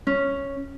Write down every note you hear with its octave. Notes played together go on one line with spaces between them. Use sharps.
C#4